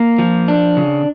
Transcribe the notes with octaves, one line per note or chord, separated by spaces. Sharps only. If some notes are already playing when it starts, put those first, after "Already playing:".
Already playing: A#3
F3
D4
C#3